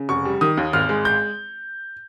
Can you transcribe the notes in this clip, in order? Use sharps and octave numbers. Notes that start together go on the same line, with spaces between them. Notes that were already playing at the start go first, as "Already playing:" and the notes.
Already playing: C#3
F1 C#6
G3
D#3 D#6
D#2
G#1 F6
G#3
G6